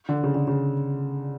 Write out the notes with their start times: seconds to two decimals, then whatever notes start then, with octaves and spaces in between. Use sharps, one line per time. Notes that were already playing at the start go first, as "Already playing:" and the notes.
0.09 D3
0.23 C#3
0.35 D3
0.47 C#3